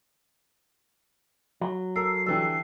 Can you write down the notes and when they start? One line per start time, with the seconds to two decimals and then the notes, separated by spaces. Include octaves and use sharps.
1.61 F#3
1.96 A4 A#4 C7
2.26 D3 E3 G3 A4 G5